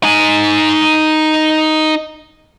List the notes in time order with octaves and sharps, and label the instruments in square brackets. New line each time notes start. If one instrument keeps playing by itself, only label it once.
[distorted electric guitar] D#4 G#5